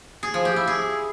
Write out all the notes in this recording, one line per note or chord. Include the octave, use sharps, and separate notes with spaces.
G#4
F3
G4
E4
G#4